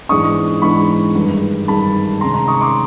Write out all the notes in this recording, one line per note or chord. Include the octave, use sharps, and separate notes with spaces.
G#2 E3 G#3 B3 D4 C#6 D#6
G#2 E3 G#3 B3 D4 B5 C#6
G2 D#3 G#3
G2 D#3 G#3 A5 B5
C3 D#3 G#3 C#4 A#5 C6
A#5 C6
C#6 D#6
C6 D6